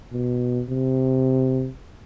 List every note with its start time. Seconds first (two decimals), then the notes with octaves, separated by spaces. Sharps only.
0.13 B2
0.69 C3